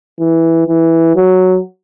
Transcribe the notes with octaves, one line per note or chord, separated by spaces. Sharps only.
E3
E3
F#3